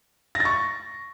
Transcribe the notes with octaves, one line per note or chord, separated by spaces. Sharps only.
A#6
A6
C#6